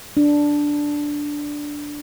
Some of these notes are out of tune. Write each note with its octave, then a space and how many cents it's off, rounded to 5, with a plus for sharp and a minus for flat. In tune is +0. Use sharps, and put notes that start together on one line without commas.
D4 +0